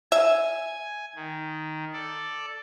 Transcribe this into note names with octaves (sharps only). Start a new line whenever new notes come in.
E5 G#5
D#3
A4 D5